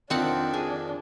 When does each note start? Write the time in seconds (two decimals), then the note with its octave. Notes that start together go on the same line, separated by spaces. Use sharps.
0.10 F2 D#3 C4 D4 F#5
0.54 G#4